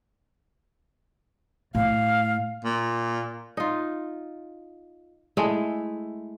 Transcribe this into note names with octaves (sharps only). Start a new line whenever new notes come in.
A2 F5
A#2
D#4 F4
G#3 A3 E4